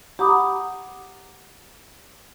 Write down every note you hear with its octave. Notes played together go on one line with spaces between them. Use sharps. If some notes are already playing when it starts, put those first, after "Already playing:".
G4 F#5 A#5 B5 D6 D#6